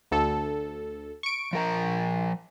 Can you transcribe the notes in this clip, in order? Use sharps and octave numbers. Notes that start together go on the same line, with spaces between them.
D2 A4
C#6 D7
F3 A#4 A#5